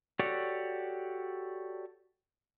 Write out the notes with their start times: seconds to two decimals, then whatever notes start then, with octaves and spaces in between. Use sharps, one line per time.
0.19 F#4 G4 A4 C#5 D5